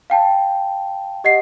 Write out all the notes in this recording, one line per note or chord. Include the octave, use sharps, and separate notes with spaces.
F5 G5 A5
G4 D#5 F#5 C7